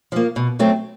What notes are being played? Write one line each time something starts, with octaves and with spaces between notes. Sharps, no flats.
F3 A#3
B2
F#3 A3 C4